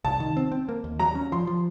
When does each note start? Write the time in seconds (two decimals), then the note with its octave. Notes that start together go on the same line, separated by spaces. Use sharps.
0.05 C2 A5
0.20 D#3
0.37 C4
0.52 C4
0.69 A#3
0.84 D#2
0.99 F#3 A#5
1.15 C#4
1.32 F3 C6
1.47 F3